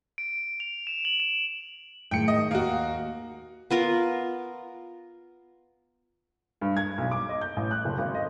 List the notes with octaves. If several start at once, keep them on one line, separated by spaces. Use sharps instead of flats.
D7
F7
E7
F#7
E7
A2 D#3 G#3 G5 C#7
D#5
D#2 A#3 F#4
B3 F4 A#4
G2
G#6
B1
D6
D#5
G6
A1
F#6
F#1
G#1
D#5